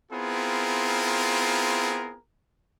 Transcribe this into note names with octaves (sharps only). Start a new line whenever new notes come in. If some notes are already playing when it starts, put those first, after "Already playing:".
B3 C4 E4 F4 G#4 A#4